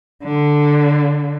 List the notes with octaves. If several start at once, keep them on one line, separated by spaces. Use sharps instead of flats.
D3